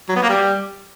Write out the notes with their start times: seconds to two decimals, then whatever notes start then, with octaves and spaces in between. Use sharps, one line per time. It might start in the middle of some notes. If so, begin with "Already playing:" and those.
0.09 F#3
0.16 B3
0.22 A#3
0.29 G3